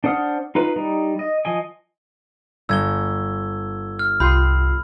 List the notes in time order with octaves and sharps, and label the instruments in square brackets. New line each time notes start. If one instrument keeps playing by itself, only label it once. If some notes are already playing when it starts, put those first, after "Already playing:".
[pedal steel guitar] D4 C5 F#5 D#6 F6
D#4 F4 B4
G3 D#4
D#5
F3 D#5 G#5
[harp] G1 [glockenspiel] E6 G#6 G7
[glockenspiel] F6
[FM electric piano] C2 F4 [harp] G5 C6 D#6 [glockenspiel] B5